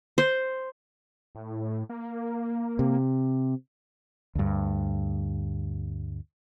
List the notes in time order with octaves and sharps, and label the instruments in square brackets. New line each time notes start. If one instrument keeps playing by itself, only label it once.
[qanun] C5
[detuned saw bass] A2
A#3
[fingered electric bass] C3
[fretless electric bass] D2 G2